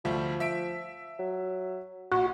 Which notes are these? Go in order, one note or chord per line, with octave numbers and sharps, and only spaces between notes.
D2 F3 G3 A3
E5 B6 D7
F#3
A#1 F#4